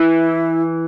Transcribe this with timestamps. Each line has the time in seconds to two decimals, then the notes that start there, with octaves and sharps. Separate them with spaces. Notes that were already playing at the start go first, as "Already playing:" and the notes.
Already playing: E3 E4